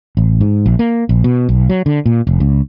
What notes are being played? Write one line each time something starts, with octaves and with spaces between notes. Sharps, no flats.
A1
G#2
A#1
A#3
A#1
B2
B1
F#3
D3
A#2
F1
C#2